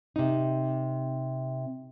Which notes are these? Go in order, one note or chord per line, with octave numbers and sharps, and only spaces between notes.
C3 D#4